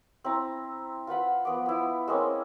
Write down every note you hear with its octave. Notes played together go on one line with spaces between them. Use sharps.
C4 E4 A#5
F4 B4 F#5 B5
F3 B3 D6
B3 E4
G#3 A#3 C4 C#4